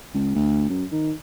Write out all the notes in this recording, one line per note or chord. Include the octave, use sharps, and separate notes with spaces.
C#2
D2
F#2
D#3